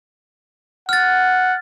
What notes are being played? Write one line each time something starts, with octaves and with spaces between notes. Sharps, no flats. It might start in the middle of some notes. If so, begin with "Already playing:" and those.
F#5 F6 A6